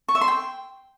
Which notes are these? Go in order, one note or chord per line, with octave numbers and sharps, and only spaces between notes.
C#6
E5
C6
G5